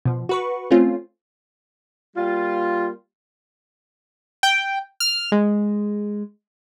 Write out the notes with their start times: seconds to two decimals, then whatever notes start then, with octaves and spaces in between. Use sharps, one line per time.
0.05 B2 F3
0.29 F#4 B4 C#6
0.71 A3 C4 C#4 F4
2.16 G3 A#3 F4
4.43 G5
5.00 F6
5.32 G#3